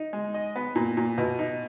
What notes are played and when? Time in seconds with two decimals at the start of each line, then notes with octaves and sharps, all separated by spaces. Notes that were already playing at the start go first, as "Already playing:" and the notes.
Already playing: D#4
0.13 G#3
0.34 D#5
0.56 B3
0.75 A#2
0.97 A#2
1.18 B2
1.39 D#4